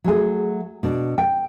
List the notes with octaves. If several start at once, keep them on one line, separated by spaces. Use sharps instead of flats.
F#3 A3 G#4
B2 D4
G5